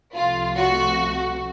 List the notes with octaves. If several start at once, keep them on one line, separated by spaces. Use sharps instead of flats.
C2 C3 F3 A3 F4
F#4